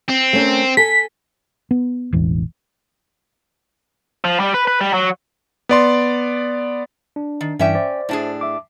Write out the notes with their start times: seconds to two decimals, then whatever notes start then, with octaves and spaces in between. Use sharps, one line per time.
0.08 C4
0.33 A3 C#4 A#4
0.77 A4 G#5 B6
1.71 B3
2.13 E1 A1 E2
4.25 F3
4.40 G3
4.54 B4
4.67 B4
4.81 G3
4.94 F#3
5.69 B3 D5 C6
7.16 D4
7.41 D#3
7.59 G2 E3 C#4 D5 E5 G5
7.75 C5 D5
8.09 A2 D4 G#4
8.41 E5 D6